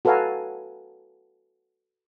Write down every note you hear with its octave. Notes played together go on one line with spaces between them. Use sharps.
F#4 A4 B4 F5 G#5 A#5